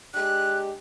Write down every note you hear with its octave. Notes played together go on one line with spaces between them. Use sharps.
G#3 D4 G4 F#6